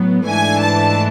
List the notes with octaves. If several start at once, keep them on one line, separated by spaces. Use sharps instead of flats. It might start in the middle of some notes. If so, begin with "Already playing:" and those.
Already playing: A2 F#3 B3
G#2 E3 A3 D4 G#5
A5